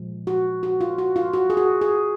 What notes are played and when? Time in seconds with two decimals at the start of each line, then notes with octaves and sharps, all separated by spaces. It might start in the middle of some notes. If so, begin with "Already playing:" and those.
Already playing: A#2 F3 G#3
0.27 F#4
0.63 F#4
0.81 F4
0.98 F#4
1.16 F4
1.34 F#4
1.50 G#4
1.57 F#4
1.81 G#4